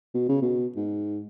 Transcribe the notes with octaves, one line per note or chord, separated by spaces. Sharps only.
B2
C#3
B2
G#2